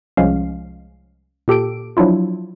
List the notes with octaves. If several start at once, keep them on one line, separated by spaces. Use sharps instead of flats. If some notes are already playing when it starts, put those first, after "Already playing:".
C2 F3 G#3 C#4 F5
A#2 G4 A4 D7
F3 F#3 D4 E4 F4